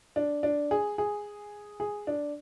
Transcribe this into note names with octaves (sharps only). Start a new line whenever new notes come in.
D4
D4
G#4
G#4
G#4
D4